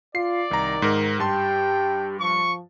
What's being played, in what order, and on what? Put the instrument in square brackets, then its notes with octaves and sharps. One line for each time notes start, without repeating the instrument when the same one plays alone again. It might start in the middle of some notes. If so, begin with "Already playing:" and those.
[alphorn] F4 [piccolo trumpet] D5 [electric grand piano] C7
[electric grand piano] C2 A#5 [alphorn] D#3
[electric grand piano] G#2 A#4
[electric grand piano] G2 A5 C6 [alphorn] G4 [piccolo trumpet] G5
[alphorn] F3 [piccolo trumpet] C#6